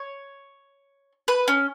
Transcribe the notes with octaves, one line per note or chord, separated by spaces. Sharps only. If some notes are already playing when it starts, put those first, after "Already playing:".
Already playing: C#5
B4
C#4